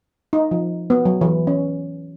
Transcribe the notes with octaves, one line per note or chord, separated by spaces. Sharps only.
D#4
F3
B3
F#3
E3
C#4